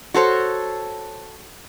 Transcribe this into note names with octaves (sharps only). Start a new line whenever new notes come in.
F#4 A4 C5 C#5